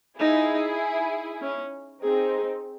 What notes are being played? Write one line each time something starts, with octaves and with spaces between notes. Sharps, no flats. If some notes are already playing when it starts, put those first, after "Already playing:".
D#4 E4 G#4
C#4
C4 D#4 G#4